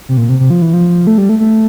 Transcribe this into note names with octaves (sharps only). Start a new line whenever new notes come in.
C3
A#2
C3
C3
F3
E3
F3
A3
G3
A3
A3